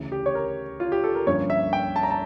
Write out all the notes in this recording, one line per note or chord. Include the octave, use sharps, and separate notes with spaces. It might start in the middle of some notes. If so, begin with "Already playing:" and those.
Already playing: D2 C#3 E3
G4
C#5
A#4
F4
G4
A4
A#4
G2 D3 F3 A#3 C#4 C#5
E5
G5
A5
A#5
A5